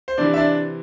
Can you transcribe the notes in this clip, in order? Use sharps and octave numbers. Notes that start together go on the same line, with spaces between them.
C5
C3 E3 D4 D5
E5
D4 D5